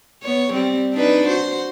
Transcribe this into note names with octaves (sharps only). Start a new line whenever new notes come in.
B3 C#5
G3 C4
D4 D#4 B4
F#4 C5